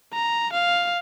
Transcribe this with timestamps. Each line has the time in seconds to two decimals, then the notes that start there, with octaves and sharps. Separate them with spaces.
0.13 A#5
0.53 F5